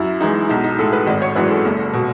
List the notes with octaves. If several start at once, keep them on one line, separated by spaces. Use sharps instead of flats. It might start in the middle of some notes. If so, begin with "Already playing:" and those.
Already playing: F#2 E4
E3 G#3 D#4
B1 D#4
D#4
A2 G#3 A4
B4
G#1 D#5
C#5
F#2 E3 G#3 B4
A4
F#1
B2